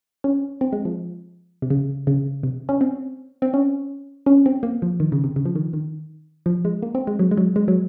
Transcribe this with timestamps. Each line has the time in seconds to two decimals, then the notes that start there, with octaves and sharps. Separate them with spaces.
0.24 C#4
0.61 C4
0.73 G#3
0.85 F3
1.62 C3
1.70 C#3
2.07 C#3
2.43 C3
2.69 C#4
2.81 C4
3.42 C4
3.54 C#4
4.26 C#4
4.46 C4
4.63 A#3
4.82 F3
5.00 D#3
5.12 C#3
5.24 C3
5.36 C#3
5.46 F3
5.56 D#3
5.73 D#3
6.46 F3
6.65 G#3
6.82 A#3
6.95 C4
7.07 G#3
7.19 F#3
7.31 G#3
7.37 F#3
7.56 G#3
7.68 F#3